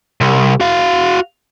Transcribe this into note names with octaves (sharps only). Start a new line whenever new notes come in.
C2
F#4 F5